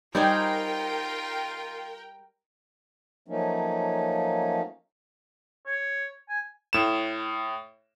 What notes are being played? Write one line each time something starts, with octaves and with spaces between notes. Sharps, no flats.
G3 D#4 F4 A#4 C5 G5 G#5
F3 F#3 A3 A#3 C#4 D#4
C#5
G#5
A2 E7